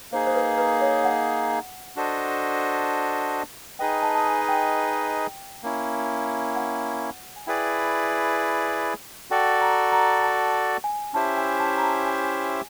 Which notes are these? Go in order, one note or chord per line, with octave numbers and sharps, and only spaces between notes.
A#3 D#4 G#4 C5
C5
B4
B4
C#5
F#5
D4 F#4 A4 C5 D#5
D#4 G#4 B4 D#5 G5
A5
A5
G#5
G#5
G5
A#3 C#4 E4
F#5
G#5
E4 G#4 B4 D5 G5
F#4 A4 D5 G5
A#5
A#5
A5
G#5
C#4 E4 G4 C5 E5 A5
G#5
A5
A#5
A5
G#5